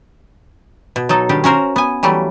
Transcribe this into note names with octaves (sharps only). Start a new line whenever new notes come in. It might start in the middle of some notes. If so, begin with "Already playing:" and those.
B2
F#3 D#4 A4
D#3 G3 D4 G4
C#4 F#4 A#4 C5
B3 G#5
E3 F#3 G3 A3